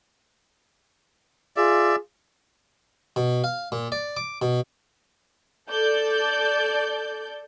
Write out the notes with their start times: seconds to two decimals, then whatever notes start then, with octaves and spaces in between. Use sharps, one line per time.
1.56 F4 G#4 D5 E5
3.16 B2
3.44 F5
3.72 A#2
3.92 D5
4.17 D6
4.42 B2
5.70 A4 D5 G6